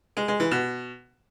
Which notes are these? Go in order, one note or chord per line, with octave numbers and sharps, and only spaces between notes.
G#3
G#3
E3
B2